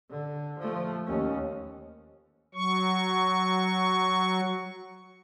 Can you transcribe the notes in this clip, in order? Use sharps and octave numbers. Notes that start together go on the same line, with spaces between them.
D3
F3 A3
D#2 C#4
F#3 C#6